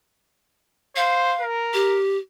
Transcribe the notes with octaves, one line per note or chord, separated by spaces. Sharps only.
C5 F5
A#4
G4